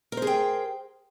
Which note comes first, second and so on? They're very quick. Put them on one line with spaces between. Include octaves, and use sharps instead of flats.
A#4 C5 G#4 G5